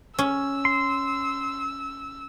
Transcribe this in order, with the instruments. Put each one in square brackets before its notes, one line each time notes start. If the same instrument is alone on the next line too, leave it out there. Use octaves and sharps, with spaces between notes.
[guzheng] C#4 [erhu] E6
[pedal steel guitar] C6